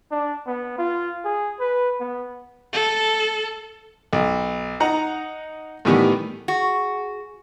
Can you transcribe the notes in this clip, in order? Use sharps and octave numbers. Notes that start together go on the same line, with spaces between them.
D4
B3
F4
G#4
B4
B3
A4
B1
D#4 F#5 A#5
A2 D#3 E3 G3 B3
F#4 G#4